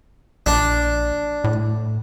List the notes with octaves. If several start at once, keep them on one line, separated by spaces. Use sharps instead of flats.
A#1 D4
A2